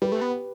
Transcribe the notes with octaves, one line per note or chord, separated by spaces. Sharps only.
G3 G4 B4
A3
B3